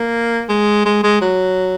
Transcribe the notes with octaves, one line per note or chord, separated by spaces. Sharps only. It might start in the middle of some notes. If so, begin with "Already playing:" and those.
Already playing: A#3
G#3
G#3
G#3
F#3